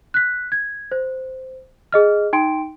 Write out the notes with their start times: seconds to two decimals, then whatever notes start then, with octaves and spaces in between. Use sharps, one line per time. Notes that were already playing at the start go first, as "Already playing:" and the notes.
0.14 F#6 B6
0.52 G#6
0.92 C5
1.92 G#4 D#5 F6
2.33 D#4 G5 C6 D7